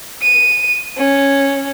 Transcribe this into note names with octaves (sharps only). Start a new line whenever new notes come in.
D#7
C#4